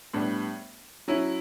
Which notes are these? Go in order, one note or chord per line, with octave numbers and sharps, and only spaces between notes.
A2 G3 B3 D4
F#3 C#4 E4